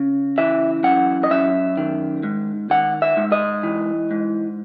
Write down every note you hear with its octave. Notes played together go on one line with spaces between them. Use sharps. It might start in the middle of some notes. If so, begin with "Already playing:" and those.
Already playing: C#3
E3 E5
F#2 F#5
D#5
F#2 E5
D#3
G#2
D#3 F#5
E5
G#2
D#5
E3
G#2